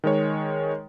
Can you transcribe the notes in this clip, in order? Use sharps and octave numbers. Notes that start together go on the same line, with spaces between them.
D#3 G#3 C#5